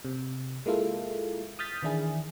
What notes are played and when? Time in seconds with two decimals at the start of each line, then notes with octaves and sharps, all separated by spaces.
0.05 C3
0.66 G#3 A#3 E4 F4 A4
1.59 D#6 F6 G6 A6 B6
1.83 D#3 E3 D4 E4 G#4